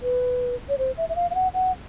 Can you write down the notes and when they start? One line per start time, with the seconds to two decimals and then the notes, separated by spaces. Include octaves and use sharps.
0.02 B4
0.69 C#5
0.78 C5
0.98 E5
1.09 E5
1.16 F5
1.31 F5
1.35 F#5
1.54 F#5